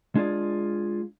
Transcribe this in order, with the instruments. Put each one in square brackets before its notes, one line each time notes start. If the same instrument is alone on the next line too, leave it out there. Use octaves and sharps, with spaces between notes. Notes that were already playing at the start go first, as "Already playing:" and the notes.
[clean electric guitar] G#3 D4 F4 G#4 D5